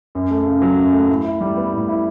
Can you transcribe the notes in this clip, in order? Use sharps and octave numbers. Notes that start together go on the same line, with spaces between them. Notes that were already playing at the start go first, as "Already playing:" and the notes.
F#2
A3
C#3
F#3
F#2
A3
A2
E4
G3
B3
A2
E4